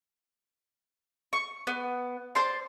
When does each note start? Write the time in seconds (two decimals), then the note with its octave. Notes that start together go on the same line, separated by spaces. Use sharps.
1.33 C#6
1.67 B3
2.35 C5 D5 A5 C6